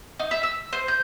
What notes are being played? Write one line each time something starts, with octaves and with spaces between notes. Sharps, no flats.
D#4
E5
E6
C5
G6